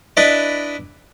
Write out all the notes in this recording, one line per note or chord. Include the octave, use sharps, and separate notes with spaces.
D4 E4 B4 D5 D#5